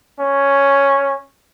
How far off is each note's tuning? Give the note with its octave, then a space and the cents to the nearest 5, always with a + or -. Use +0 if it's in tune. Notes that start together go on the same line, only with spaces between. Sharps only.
C#4 +0